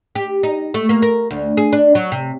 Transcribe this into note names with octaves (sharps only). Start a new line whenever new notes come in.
G4
D#4
A3
A#3
A#4
D2
G#4
D4
F#3
C3